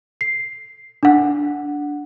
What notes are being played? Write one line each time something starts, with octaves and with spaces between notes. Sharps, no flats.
C7
D4 F#5